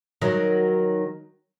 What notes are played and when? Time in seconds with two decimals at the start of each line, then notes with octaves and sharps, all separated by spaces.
0.22 D#3 F#3